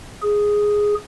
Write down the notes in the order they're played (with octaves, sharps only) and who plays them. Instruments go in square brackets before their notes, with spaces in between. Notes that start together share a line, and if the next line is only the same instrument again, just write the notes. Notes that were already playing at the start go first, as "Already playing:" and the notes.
[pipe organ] G#4